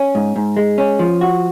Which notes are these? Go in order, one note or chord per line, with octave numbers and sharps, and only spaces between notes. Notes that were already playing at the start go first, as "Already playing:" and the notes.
Already playing: C#4
G#2
G#2
G#3
C#4
F3
F#4